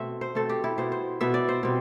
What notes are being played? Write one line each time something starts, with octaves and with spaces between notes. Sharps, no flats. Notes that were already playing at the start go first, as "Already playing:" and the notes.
Already playing: B2 A3 C4 E5
C5
B2 A3 C4 A4
G4
E4
B2 B3 C5
C5
B2 B3 E5
D5
C5
B2 G3 C4